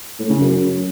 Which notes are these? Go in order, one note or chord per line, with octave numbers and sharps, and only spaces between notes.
A2
C#3
F#2